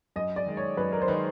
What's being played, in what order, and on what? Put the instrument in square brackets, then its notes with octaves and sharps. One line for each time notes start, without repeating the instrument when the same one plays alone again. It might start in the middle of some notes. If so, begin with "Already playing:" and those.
[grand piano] F#2 [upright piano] D#5
[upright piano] D5
[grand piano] D#3 G#3
[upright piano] C#5
[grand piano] F#2 [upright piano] B4
[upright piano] A#4
C5
[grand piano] D#3 G#3 [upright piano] B4